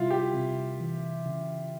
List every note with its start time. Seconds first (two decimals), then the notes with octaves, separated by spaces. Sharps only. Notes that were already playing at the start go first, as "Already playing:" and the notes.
Already playing: C3 G3 E4 F4
0.10 G4
0.34 C3
0.80 E3
1.26 C#3